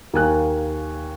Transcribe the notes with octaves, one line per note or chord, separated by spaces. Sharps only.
D#2 A#3 G#5 F#6